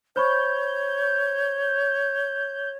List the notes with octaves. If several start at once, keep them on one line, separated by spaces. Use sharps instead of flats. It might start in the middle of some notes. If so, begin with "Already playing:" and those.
C5 C#5 B5 C#6 G6